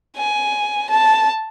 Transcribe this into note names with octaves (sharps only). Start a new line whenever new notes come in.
G#5
A5